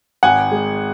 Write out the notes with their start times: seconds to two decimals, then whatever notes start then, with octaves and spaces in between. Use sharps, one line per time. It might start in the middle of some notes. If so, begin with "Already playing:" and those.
0.23 G#1 F#5 G#5
0.52 G#3